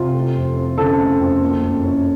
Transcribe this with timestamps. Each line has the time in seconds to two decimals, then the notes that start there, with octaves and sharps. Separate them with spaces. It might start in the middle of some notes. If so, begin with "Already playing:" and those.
Already playing: C3 F4
0.14 A3
0.36 F2
0.56 C4
0.77 C#3 A4
0.98 A3
1.20 F2
1.41 A#3
1.62 F#2
1.83 C#4